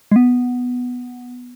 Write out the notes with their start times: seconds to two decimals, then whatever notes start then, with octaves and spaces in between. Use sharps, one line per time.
0.12 G#3
0.16 B3